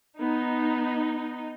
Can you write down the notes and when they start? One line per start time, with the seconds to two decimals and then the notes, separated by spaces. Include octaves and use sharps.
0.20 B3 D#4